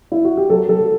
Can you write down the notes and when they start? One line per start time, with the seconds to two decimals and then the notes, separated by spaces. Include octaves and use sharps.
0.12 E4
0.25 F#4
0.37 G4
0.50 F#3 A4
0.68 F#3 A4